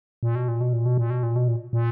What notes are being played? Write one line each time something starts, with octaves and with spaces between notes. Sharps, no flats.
A#2
B2
A#2
B2
A#2
B2
A#2
B2
A#2
B2
A#2
A#2